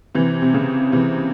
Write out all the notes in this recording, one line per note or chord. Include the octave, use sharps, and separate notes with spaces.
C3 E3
C3
C#3
C3 E3